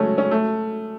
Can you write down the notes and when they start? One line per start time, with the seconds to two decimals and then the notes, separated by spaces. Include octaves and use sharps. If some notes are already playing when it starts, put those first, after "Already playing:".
Already playing: F#3 G#3 A3 C#4
0.18 C#4
0.31 A3